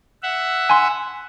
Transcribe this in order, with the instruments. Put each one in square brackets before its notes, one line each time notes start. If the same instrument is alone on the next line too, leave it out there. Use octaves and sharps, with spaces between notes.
[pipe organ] E5 F#5
[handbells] G#5 C6